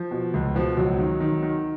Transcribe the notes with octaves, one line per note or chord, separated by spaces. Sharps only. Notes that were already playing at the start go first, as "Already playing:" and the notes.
Already playing: F3
B2
C#2
B2 F3
C#2 F#3
D#3
D#3
D#3